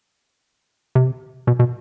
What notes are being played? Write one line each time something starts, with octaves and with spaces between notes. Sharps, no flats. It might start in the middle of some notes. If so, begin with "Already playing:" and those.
C3
B2
B2